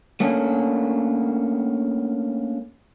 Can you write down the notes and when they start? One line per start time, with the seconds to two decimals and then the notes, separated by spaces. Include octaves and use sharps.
0.20 A3 A#3 C#4 D4